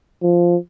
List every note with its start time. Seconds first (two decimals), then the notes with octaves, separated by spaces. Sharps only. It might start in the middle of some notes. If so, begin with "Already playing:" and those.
0.23 F3